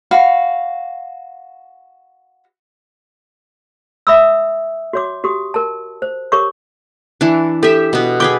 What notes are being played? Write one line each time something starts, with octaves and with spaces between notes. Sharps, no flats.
F#4 F5 B5
E5 B5 D#6 E6
F#4 C#5 D6
F#4 G4 D#6
A#4 A5
C5
G4 A#4 C#5 C#6 D6
E3 D4
G4 A4 E5
B2 B3
G#4 B4 G5 D6